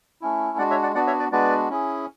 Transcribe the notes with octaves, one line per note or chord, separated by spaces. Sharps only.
A3 C#4 E4
G#3 D4 F#4 D5 F#5
C#5 E5
D5 F#5
B3 D4 F#4 D5 F#5
C#5 E5
B4 D5
G#3 B3 D4 F#4 B4 D5
C#4 E4 G#4